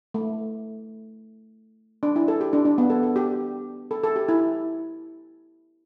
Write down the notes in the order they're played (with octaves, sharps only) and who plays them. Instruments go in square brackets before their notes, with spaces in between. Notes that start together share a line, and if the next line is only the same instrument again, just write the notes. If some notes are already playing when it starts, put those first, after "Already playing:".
[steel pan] A3
D4
E4
A4
G4
D4
D4
B3
A4
A4
G4
A4
A4
G4
E4